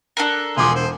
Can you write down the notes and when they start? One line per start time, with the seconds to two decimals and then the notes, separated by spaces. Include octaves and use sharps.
0.17 D4 A4 A#4
0.57 E1 F3 G#4 C6 D6
0.75 C5